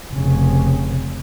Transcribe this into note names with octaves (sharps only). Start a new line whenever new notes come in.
F1 C#3